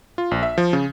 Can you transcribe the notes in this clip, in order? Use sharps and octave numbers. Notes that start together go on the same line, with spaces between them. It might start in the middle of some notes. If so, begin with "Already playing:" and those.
F4
A#1
E5
F3
C#3